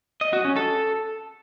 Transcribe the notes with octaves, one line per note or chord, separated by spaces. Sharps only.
D#5
F#4
C#4
A4